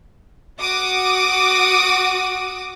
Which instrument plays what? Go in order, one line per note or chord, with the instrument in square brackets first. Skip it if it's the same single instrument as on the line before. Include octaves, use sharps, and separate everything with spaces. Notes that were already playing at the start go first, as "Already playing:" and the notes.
[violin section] F#4 D6 D#6